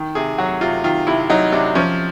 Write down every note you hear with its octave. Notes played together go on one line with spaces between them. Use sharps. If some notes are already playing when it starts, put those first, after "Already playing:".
Already playing: D#3
C3 G#4
F#3 F#4
C3 F4
D#3 F4
C3 E4
F#3 D#4
C3 D4
F3 C#4